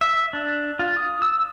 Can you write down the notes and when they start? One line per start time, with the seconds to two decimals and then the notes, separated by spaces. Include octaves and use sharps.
0.01 E5
0.33 D4
0.79 F4
0.97 D#6
1.22 E6